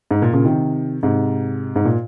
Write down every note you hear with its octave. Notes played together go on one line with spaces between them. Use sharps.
G#2
A#2
A#2 C#3
C3 D#3
G#2 C3
G#2
A#2